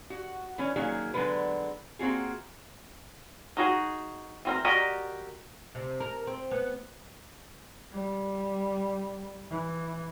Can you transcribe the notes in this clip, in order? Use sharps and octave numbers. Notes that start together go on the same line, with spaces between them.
F#4
E3 B3 C#4
D#3 F#3 A#3 C#4 G#4
D3 F#3 G#3 B3 B4
A#3 C4 F4 F#4 G#4
D#4 F#4 G#4
E3 C4 A#4
F#4 G4 A#4 D5 D#5
C3
A#4
C4
B3
G3
E3